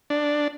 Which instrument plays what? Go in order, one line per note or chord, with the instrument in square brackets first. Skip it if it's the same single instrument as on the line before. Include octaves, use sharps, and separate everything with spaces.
[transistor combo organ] D4